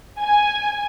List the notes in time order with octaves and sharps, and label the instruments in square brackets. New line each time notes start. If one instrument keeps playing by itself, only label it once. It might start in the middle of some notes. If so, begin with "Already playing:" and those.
[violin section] G#5